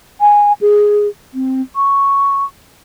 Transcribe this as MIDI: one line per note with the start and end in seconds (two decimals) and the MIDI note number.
0.21 0.53 80
0.61 1.08 68
1.34 1.61 60
1.76 2.44 85